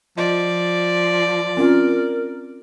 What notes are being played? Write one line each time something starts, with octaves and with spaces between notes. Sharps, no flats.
F3 D5 D#5
C4 C#4 F4 A#4